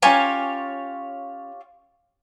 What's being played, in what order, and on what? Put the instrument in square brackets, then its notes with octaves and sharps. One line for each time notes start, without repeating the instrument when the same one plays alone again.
[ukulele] C#4 G#5 A#5 [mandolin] F4 G4 C#5